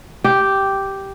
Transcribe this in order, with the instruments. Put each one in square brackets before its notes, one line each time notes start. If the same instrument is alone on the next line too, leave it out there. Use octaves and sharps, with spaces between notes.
[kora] G4